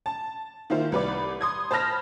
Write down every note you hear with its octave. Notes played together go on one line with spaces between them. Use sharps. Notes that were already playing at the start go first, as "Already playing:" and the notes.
A5
D#3 A#3 E4 F4 C5
C2 B4 D5
C6 D#6 G#6
C5 A5 B5 F6 A#6